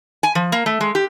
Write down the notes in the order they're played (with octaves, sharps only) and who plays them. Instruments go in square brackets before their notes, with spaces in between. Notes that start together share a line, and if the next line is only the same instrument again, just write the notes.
[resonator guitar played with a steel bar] G#5
F3
A#3
A3
G#3
G4